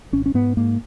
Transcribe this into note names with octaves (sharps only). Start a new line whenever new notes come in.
G#1 C#4
C#4
G#2 B3
G#2 A#3